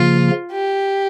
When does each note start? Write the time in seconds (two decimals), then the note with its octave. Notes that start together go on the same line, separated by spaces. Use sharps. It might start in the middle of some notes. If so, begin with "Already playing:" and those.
Already playing: C#3 F3 A#3 F4
0.53 G4